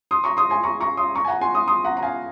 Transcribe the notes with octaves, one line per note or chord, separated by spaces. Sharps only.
C6 D#6
A#5 C#6
C6 D#6
G#5 C6
A#5 C#6
A#5 C#6
C6 D#6
A#5 C#6
G#5
F#5 A#5
G#5 C6
C6 D#6
C6 D#6
F#5 A#5
A#5
F5 G#5